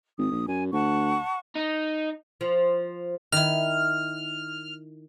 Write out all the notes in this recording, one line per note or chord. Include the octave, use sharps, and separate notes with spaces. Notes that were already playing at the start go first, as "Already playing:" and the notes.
G#1 D#6
A#1
F#2 G#5
D2 F#5 A5 C#6
D#4
F3
D#3 E4 F6